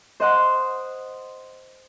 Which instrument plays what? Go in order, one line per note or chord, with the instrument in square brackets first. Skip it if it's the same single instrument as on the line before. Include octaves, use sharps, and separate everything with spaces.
[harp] C5 D#5 F#5 C6